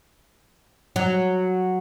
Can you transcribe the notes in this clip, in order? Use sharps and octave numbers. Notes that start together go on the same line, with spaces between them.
F#3